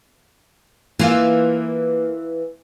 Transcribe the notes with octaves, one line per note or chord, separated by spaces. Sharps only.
E3 A#3 F4